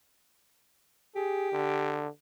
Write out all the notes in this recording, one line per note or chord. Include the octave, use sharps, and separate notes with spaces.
G4 G#4
D3